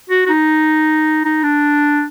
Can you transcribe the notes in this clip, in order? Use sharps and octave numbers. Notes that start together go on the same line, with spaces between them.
F#4
F#4
D#4
D#4
D4